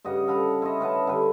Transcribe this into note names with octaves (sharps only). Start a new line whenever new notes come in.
G2 C#3 D#5 F#5
A4 F5 F#5 B5
E4 F4 C#5 D#5
C#4 B4 F#5 A5
D3 G3 B4